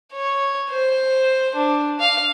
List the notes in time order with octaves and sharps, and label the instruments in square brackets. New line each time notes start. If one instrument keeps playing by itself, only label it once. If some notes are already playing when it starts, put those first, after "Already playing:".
[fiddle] C#5
C5
D4
F5